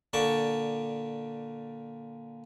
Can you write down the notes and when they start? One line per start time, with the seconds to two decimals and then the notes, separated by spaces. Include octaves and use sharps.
0.13 A#2 D3 D5 A5 C#6